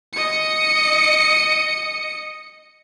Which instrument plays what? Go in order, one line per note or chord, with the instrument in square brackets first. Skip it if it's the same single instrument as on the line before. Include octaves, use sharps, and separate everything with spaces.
[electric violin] D#5 C#7